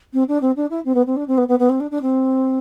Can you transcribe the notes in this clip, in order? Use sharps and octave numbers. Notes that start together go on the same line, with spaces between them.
C4
D4
C4
D4
E4
C4
B3
C4
D4
C4
B3
B3
B3
C4
D4
D4
C4